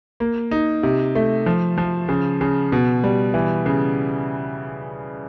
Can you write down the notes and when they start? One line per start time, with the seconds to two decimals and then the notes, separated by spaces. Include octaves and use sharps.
0.20 A#3
0.51 D#4
0.83 C3
1.15 A3
1.46 F3
1.78 F3
2.09 C#3
2.41 C#3
2.72 B2
3.04 G3
3.34 E3
3.66 C#3